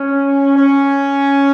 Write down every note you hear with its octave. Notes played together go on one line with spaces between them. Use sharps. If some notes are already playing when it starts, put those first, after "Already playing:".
Already playing: C#4
C#4